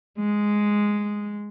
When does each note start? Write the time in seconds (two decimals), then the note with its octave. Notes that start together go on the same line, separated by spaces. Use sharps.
0.18 G#3